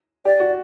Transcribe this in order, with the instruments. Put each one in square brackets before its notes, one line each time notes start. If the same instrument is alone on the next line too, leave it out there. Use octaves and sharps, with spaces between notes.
[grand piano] G4 [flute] D5
[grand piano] F#4